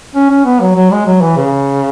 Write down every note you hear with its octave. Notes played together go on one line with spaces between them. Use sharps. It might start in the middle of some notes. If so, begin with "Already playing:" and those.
C#4
C#4
B3
F#3
F#3
G#3
F#3
E3
C#3